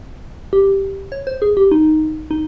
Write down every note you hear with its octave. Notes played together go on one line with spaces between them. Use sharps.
G4
C#5
C5
G#4
G4
D#4
D#4